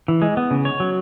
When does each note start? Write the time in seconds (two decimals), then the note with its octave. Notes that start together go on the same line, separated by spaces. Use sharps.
0.08 E3
0.22 G#3
0.37 B3
0.51 C#3
0.65 C#5
0.80 F#3